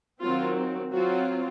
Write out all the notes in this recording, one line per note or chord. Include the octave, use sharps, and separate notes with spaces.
D#3 F#3 C4 F4
F#3 C4 F4 F#4